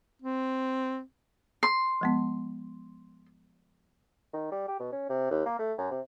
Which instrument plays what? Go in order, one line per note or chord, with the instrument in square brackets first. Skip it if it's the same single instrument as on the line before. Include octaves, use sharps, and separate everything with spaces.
[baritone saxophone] C4
[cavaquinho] C6
[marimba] F3 G#3 B3
[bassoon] D#3
G3
G4
B2
C#4
C3
D#2
A#3
A3
F#2
C3